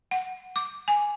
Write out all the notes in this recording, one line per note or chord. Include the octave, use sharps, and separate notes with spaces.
F#5
D6
G#5